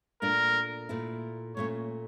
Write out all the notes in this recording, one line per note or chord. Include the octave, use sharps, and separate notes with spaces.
A#2 A3 D4 A#4
A#2 A3 E4
A#2 A3 C#4 C#5